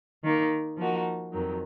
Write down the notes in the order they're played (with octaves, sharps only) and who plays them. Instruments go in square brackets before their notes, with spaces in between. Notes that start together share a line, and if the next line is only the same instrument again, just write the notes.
[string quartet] D#3 A#3 D#4
F3 A#3 D#4 F#4
F2 D#3 F#3